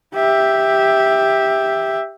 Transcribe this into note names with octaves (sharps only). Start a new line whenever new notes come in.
G4 E5